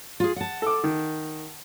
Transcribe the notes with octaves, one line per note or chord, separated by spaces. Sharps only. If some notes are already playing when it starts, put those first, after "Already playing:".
F4 G#4
F#5 A5
A4 D6
D#3